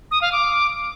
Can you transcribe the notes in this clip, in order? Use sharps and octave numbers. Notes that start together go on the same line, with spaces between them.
D#6
F5
D6